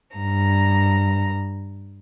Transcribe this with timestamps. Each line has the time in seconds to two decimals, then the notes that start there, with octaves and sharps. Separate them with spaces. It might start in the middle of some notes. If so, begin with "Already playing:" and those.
0.17 G2 A#5